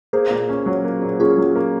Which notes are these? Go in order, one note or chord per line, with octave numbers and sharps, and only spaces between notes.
A#3 G#4 C5
A#2
C#4
F#3
A#3
A#2
C#4 F4 G#4
F#3
A#3